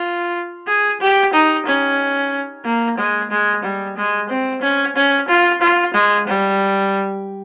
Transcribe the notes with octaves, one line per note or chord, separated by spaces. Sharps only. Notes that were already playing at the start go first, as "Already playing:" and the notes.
Already playing: F4
G#4
G4
D#4
C#4
A#3
G#3
G#3
G3
G#3
C4
C#4
C#4
F4
F4
G#3
G3